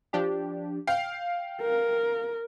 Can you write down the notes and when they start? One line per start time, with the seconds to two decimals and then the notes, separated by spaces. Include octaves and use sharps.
0.13 F3 D4 G4
0.87 F5 G5
1.61 A#4